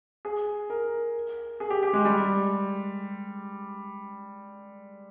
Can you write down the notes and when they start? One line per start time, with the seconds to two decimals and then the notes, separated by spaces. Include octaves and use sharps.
0.25 G#4
0.70 A#4
1.60 G#4
1.70 G4
1.83 G4
1.93 G#3
2.05 G3